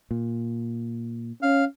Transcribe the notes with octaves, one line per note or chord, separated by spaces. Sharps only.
A#2
C#4 F5